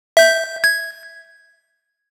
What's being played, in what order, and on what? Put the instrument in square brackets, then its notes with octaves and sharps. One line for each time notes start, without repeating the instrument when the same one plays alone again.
[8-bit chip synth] E5 G6
G#6